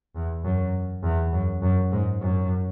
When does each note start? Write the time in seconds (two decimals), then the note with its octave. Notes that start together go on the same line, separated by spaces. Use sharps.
0.16 E2
0.44 F#2
1.03 E2
1.33 F#2
1.62 F#2
1.92 G#2
2.21 F#2